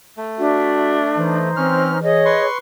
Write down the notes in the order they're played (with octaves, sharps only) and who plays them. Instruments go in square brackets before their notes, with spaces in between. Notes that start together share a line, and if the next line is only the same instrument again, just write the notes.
[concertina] A3
[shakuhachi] D4 [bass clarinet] F#4 [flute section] E5
[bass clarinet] E3 [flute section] D#4 C5
[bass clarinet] E3 [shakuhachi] C4 [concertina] C#4 F6
[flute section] G#4 C#5 [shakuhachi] D#5
[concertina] B4 C6 C#6